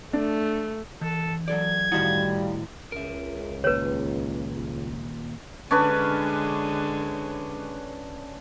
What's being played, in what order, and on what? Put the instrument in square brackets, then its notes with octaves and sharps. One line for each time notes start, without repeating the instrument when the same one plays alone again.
[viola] A3 [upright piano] D4
[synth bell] E3 [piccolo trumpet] A4
[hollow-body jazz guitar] F#3 A4 D5 [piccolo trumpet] G#6
[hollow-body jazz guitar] A2 D#3 F#5 [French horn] G3 [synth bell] E4 F#4 F5
[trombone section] C#2 [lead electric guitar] A#4 E5
[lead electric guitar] D#2 A#2 [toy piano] B4 C#5
[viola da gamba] D3 G#3 [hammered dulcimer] C#4 D4 B4